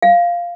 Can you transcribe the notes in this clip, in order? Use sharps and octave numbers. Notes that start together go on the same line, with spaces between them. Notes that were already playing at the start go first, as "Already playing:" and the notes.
F5